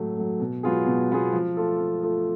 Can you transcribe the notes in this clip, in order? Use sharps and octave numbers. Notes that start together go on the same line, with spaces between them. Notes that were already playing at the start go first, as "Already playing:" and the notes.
Already playing: A2 F#3 A3
F#3 A3
B2
F#3 B3 F4 G#4
B2
F#3 B3 F4 G#4
F3
A3 F4 A4
F3
A3 F4 A4